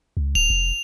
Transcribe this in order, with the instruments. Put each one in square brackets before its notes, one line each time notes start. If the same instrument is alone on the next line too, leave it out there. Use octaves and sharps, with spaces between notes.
[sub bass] C#2
[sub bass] D1 [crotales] F7
[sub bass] F1